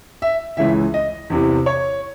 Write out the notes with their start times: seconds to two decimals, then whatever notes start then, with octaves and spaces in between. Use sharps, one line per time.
0.22 E5
0.57 C#2 C#3 E3 E5
0.94 D#5
1.30 E2 C3 E3
1.66 C#5